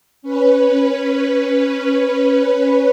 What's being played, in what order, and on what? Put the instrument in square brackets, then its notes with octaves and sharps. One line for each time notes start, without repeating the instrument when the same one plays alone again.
[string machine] C#4 B4